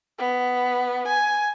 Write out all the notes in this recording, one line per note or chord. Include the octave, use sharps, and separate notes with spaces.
B3
G#5